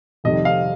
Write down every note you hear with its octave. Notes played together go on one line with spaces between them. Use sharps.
F1 F2 C3 D#3 G3 D#5
F5